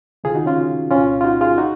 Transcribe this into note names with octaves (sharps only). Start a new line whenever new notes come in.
C#2 C3 D#3 F4 G#4
D#4 F#4
C#4 F4
C2 A#2 C#4 F4
F4
D#4 F#4
F4 G#4
D#4 F#4